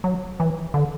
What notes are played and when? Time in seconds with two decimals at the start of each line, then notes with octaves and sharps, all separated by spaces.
0.04 F#3
0.40 E3
0.74 D3